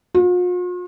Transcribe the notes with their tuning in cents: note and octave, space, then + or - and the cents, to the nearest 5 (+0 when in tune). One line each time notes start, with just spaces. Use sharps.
F4 +45